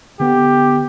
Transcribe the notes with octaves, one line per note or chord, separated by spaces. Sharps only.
D3 B3 G4